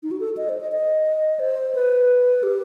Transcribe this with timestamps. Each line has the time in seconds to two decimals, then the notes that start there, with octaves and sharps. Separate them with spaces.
0.03 D#4
0.11 F#4
0.20 A4
0.37 D#5
0.49 C5
0.61 D#5
0.72 D#5
1.39 C5
1.75 B4
2.43 G4